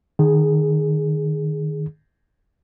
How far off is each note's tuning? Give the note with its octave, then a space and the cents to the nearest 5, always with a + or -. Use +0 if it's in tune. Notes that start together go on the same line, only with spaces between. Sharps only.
D#3 -25 G#4 +0